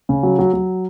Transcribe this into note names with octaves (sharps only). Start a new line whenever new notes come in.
C#3
F#3
F#3
F#3